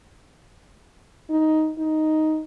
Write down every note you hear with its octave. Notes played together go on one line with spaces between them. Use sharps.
D#4
D#4